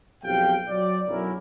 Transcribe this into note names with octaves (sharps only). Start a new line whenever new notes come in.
B1 F2 G4 F5 G5
F#3 D5
B1 F#2 F#3 C#4 E4 A#4